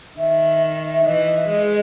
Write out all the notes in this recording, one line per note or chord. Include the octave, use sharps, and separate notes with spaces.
D#3 E5
E5
E3 D#5
G#3